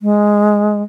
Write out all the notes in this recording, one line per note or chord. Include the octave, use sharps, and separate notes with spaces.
G#3